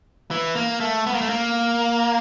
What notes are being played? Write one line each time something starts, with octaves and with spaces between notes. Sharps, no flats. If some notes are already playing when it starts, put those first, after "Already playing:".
E3
A#3
A3
B3
A#3
A3
A#3